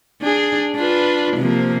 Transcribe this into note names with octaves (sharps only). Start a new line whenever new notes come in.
D4 G#4
D4 F4 B4
C3 F3 A#3